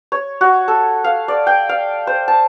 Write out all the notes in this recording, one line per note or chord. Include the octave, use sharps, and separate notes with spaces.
C#5
F#4
A4
F5
D5
G5
F5
C5
A5